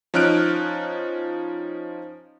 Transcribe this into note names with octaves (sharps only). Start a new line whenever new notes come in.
F3 C#4 D#4 F6 F#6 D7